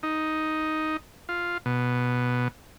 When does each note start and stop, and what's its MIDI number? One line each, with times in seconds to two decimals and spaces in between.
0.03 0.97 63
1.29 1.58 65
1.66 2.48 47